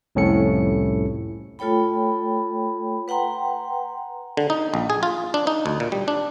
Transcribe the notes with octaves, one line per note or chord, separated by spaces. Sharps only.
C2 F2 A2 C#4 A4 C#7
A3 F4 A4 C#5 G5 B5
B4 F#5 G5 A#5 C6
D3
D#4
A#1
G#4
F4
D4
D#4
D2
A#2
G3
D4